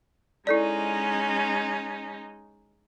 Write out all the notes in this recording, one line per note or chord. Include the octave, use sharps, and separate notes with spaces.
G#3 C#4 D#4 E4 A4 D5